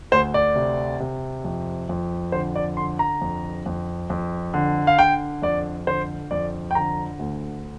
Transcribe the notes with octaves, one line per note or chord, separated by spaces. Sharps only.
D2 C5
D5
C3
C3
F2
F2
D3 C5
D5
D3 C6
A#5
F2
F2
F2
D3
F5
D3 G5
F2 D5
D3 C5
F2 D5
G5
D3 A#5
D2